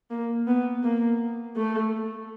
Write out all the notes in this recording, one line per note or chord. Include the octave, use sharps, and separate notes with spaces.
A#3
B3
A#3
A3